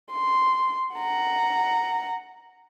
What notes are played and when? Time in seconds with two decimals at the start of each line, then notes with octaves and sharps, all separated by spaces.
0.13 C6
0.96 F#5 A#5